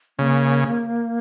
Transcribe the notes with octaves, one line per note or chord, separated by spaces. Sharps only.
C#3 A#3